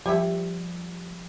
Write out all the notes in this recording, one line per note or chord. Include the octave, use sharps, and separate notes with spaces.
F3 G3 G4 C#5 E5